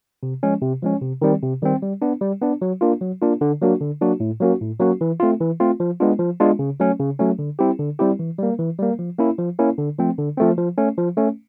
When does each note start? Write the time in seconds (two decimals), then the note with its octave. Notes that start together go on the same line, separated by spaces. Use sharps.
0.23 C3
0.43 F3 G#3 C#4
0.62 C3
0.82 F3 G#3 C#4
1.02 C3
1.22 D#3 G3 C4
1.42 C3
1.62 D#3 G3 C4
1.82 G3
2.02 B3 D4
2.21 G3
2.41 B3 D4
2.62 F#3
2.81 A#3 D4 F4
3.01 F#3
3.22 A#3 D4 F4
3.41 D3
3.62 F#3 A#3 D4 F#4
3.80 D3
4.01 F#3 A#3 D4 F#4
4.20 A2
4.40 F#3 A#3 C#4 F#4
4.61 A2
4.80 F#3 A#3 C#4 F#4
5.01 E3
5.20 A3 C4 F4
5.40 E3
5.60 A3 C4 F4
5.80 F3
6.00 G#3 B3 D4 F4
6.19 F3
6.40 G#3 B3 D4 F4
6.59 C#3
6.80 F#3 A3 C#4
6.99 C#3
7.19 F#3 A3 C#4
7.39 D3
7.59 G3 C4 E4 G4
7.79 D3
7.99 G3 C4 E4 G4
8.19 E3
8.39 G3 A#3
8.59 E3
8.79 G3 A#3
8.99 F3
9.19 A#3 C#4 E4
9.38 F3
9.59 A#3 C#4 E4
9.78 D3
9.99 F3 A3 C4
10.18 D3
10.37 F3 A3 C4
10.58 F3
10.78 A3 C#4
10.98 F3
11.17 A3 C#4